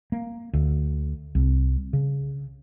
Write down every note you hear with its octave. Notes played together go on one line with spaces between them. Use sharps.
A#3
D2
C2
C#3